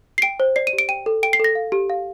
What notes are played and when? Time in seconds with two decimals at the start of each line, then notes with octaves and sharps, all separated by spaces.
0.18 C7
0.22 G5 D7
0.40 C5
0.56 D5 C7
0.67 D#7
0.73 G4
0.79 D7
0.89 G5 D#7
1.06 A4
1.23 G5 D7
1.33 C7
1.40 A4 A#6
1.55 F5
1.72 G4
1.90 F5